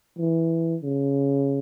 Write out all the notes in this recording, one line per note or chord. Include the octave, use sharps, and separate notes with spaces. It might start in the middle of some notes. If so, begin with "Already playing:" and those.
E3
C#3